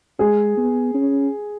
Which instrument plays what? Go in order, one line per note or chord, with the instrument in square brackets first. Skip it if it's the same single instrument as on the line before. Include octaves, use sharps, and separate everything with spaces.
[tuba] G#3 [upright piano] G#4
[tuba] B3
C#4